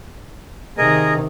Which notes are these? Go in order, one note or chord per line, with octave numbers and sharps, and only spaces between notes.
C3 D#3 G#4 A#4 D#5